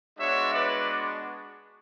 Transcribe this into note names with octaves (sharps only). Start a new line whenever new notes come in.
G#3 B3 D4 F#4 C#5 E5
B4 D5